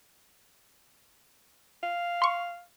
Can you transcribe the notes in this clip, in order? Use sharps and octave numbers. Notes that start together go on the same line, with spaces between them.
F5
C6 C#6